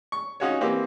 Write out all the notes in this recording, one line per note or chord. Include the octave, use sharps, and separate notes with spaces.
C#6
C#4 D#4 F4 F#4 G#4 C#5
E3 A#3 C4 G4